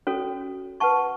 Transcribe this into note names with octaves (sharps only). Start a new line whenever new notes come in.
C#4 F#4 A4 C#5
B4 F#5 A5 C#6